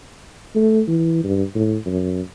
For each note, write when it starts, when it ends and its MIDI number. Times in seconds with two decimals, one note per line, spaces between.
0.55 0.81 57
0.88 1.23 52
1.24 1.43 43
1.55 1.77 45
1.86 2.22 42